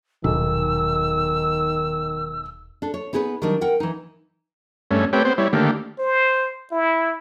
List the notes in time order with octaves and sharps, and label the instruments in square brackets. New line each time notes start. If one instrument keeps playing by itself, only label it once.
[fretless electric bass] D#1 [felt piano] B1 [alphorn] D#3 [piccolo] E6
[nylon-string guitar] D4 A4
C#5
B3 D#4 G#4 A#4 B4
D#3 F#3 G3 D4 D#4
A#4 F#5 G5
E3 D#4
[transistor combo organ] G2 A3 C#4
A3 C4 G4 B4 C#5 G5
B3 C4 C5
G3 E4 C#5
D3 D#3 A3 A#3 G4
[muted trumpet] C5
E4